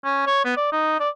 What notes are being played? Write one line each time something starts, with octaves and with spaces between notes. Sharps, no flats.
C#4
C#5
B3
D5
D#4
D5